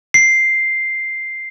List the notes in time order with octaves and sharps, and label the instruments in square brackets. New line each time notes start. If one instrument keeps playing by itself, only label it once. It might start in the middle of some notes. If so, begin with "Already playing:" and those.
[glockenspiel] C7